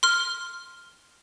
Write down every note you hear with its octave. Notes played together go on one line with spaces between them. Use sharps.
C6 F6